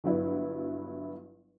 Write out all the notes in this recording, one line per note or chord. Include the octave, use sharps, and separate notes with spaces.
G1 G2 F#3 B3 E4